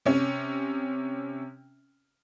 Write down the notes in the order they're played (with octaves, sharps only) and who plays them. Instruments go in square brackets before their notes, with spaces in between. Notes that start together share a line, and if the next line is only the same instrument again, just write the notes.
[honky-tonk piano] C3 C#4